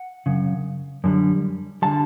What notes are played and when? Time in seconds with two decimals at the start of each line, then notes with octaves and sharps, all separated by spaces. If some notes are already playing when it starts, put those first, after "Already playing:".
Already playing: F#5
0.26 F#2 C#3
1.04 F#2 D3 G3
1.82 D3 G3 A5